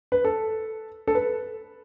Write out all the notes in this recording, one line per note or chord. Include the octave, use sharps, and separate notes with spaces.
B4
A4
A4
B4